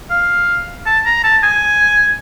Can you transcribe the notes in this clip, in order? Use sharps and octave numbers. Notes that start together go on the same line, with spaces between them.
F5
A5
A#5
A5
G#5